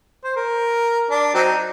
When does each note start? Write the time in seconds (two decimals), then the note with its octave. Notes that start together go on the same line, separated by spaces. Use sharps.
0.24 C5
0.36 A#4
1.10 D4
1.34 F#3 C4 D#4